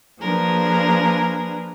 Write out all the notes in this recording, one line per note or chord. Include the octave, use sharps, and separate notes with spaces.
F3 A#3 D4 G#4 A#4 B4